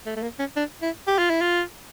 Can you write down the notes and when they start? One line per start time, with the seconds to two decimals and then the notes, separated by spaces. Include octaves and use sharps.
0.06 A3
0.16 A3
0.23 A#3
0.39 C#4
0.56 D4
0.82 E4
1.07 G4
1.18 F4
1.30 E4
1.41 F4